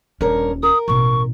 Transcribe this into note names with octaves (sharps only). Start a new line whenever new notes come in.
D#1 G2 C#4 A#4 C#5
A#4 D#6
A1 B2 C#6